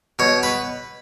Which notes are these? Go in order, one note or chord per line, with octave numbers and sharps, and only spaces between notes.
B2 C#5
B4